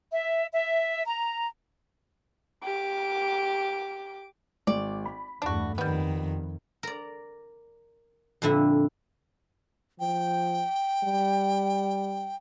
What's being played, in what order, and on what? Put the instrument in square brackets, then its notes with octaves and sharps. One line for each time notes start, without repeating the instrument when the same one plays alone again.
[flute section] E5
E5
A#5
[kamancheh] G4 D6
[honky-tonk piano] G#1 [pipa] D5
[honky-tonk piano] B5
[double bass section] E2 G2 A3 [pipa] D4 F#4
[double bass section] F2 [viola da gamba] D#3 [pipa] G3 B3
[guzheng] A#4 D5
F2 A#2 D3 E4
[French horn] F3 [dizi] G5
[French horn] G3